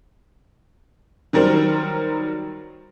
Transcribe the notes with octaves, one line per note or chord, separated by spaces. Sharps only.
D#3 F#3 G3 A#4 C5